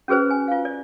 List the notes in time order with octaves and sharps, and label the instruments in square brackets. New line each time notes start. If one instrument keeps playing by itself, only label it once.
[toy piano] C#4 F#4 G#4 B4 C5
G#5
F4 F5
D5